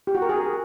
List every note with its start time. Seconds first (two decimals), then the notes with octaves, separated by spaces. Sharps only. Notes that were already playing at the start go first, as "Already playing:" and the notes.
0.07 G4
0.15 F#4
0.22 A#4
0.29 G#4